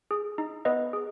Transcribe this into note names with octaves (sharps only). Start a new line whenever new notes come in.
G#4
D#4
B3 B4 D#5
G#4